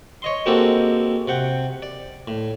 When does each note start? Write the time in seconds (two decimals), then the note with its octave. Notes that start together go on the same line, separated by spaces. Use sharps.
0.22 C#5 D#5 C6
0.46 G#3 A#3 C4 F#4 G4 A4
1.27 C3 F#5 G5
1.82 D5
2.28 A2